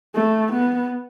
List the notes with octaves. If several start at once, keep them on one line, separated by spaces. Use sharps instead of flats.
A3
B3